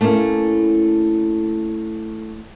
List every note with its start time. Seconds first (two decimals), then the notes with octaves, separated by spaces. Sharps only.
0.01 A3 A#3 C#4 E4